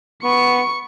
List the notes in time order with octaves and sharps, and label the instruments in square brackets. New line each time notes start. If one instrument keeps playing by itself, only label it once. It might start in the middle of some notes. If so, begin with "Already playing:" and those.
[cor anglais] B3 [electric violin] C#6 C#7